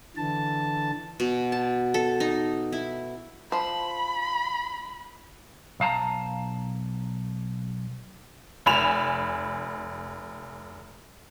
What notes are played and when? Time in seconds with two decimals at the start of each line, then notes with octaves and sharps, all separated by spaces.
0.17 D3 E3 A5
1.20 B2
1.52 A5
1.94 A4
2.20 D#4
2.72 E4
3.52 F3 C5 B5
5.80 B1 F5 A5 A#5
8.66 F1 G#5 B5 E7 F7